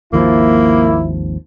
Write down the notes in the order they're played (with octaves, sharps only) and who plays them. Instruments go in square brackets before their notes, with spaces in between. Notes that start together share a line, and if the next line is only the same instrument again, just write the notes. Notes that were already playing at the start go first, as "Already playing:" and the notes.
[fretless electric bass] G#1 D#2 F3 [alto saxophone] A#3 [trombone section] E4